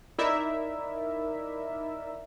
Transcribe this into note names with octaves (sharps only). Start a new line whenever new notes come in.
D#4 E4 A#4 D5 E5